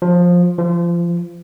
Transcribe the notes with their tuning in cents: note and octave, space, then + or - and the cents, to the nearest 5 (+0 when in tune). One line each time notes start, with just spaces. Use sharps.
F3 +15
F3 -25